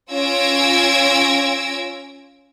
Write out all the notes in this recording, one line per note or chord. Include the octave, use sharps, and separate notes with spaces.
C#4 F4 E6 G#6 A#6 D7